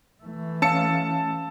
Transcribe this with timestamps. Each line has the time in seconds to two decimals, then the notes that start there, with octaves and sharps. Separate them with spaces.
0.23 E3 A3
0.62 C#4 F5 A5 E6 C#7